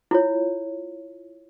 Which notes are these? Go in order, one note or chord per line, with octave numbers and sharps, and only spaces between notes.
E4 F4 C#5